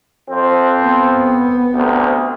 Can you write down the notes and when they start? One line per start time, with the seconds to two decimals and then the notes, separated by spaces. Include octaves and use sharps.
0.29 F2 C4
0.83 B3
1.73 D2 C3